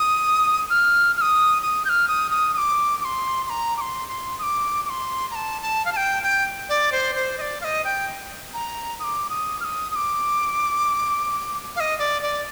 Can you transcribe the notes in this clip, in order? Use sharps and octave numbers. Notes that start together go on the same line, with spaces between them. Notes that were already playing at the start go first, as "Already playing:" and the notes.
Already playing: D#6
F6
F6
D#6
D#6
G6
F6
D#6
D#6
D#6
D6
D6
C6
C6
A#5
D6
C6
C6
D#6
D6
D6
C6
A#5
A5
A5
F5
A5
G5
G5
D5
C5
C5
D#5
D5
F5
D#5
G5
A#5
D#6
D6
D#6
F6
D#6
D#6
D6
F5
D#5
D5
D5